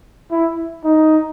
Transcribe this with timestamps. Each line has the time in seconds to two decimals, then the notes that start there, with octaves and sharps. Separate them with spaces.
0.31 E4
0.84 D#4